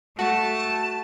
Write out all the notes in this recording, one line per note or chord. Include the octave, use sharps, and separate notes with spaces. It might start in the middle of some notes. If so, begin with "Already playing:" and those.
A3 F#4 A5